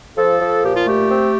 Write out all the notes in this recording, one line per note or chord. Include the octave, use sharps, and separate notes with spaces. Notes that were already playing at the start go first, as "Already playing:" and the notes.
F3 A4
F3
A#2 G4
F4
A3 G4
C4